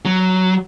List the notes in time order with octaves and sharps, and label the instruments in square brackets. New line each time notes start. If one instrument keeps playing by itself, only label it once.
[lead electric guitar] F#3